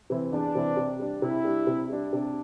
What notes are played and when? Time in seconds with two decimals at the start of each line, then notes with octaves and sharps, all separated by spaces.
0.10 C3 E3 C4 E4
0.32 E2 D4
0.55 C3 E3 C4 E4
0.77 C3
0.99 G3 D4
1.22 C3 E4
1.45 G3 D4
1.67 C3
1.90 G3 D4
2.12 C3 D4